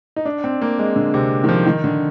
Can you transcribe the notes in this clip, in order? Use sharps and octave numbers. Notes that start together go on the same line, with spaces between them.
D#4
D4
C4
A#3
G#3
D3
C3
D#3
F3
D#3
D3